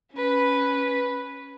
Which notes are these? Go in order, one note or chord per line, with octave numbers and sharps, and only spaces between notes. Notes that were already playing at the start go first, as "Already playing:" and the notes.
C#4 B4